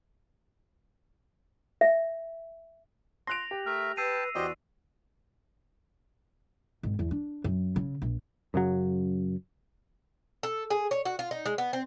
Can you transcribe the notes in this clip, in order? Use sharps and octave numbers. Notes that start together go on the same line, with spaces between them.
E5
C6 F#6 A#6 D7 F7
G4
A3 A#4 E5
B4 G5 A5 E6 C7 D#7
E2 F#4 G4 C5 D5 D#5 C6
G#1
E2
D4
F#2
C#3
A#1
F#2 C#3 F#3
A4
G#4
C#5
F#4
F4
D#4
G#3
B3
C4